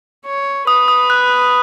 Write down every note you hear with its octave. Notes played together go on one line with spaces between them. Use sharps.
C#5
B4 D#6
D#6
F#6